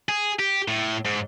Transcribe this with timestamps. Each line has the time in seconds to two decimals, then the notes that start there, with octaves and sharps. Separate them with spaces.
0.09 G#4
0.39 G4
0.68 A2
1.05 G#2